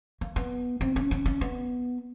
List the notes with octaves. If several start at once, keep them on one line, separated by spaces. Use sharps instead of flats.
A#3
B3
C4
C#4
C#4
C#4
B3